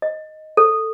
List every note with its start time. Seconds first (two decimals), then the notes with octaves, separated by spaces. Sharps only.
0.02 D#5
0.57 A4